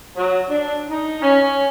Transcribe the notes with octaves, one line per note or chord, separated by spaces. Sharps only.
F#3
D4
D#4
C#4